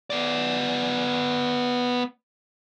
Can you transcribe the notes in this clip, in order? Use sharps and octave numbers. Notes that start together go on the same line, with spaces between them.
B3 D5